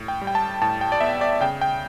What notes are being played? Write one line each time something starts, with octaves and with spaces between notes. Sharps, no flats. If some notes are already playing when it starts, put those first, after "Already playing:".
Already playing: A2
G5
G3
G5
A5
A2 A5
G5
D5
B3 E5
D5
C#3 G5
G5